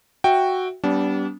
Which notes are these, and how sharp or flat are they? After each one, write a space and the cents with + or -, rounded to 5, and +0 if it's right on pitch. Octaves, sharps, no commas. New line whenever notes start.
F#4 +0 E5 +0 G5 +5
G3 -20 B3 +0 D4 -35